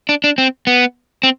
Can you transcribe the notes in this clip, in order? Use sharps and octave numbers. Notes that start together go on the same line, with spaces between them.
D4
D4
C4
B3
C4